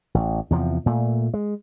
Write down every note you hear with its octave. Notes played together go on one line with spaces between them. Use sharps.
A1
E2 C3 F3
A#2 A3
G#3